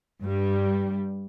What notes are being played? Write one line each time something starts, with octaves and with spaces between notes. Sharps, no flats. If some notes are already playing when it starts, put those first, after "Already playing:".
G2 G3